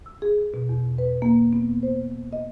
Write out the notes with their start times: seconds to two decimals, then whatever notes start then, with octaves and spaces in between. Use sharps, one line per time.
0.06 E6
0.22 G#4
0.54 B2
0.69 E2
0.98 B4
1.22 A#3
1.53 B3
1.83 C5
2.33 D#5